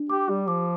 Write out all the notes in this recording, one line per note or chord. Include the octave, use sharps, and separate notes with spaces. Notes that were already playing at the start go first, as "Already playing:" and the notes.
Already playing: D4
G4 D6
G3 G4
F3 D6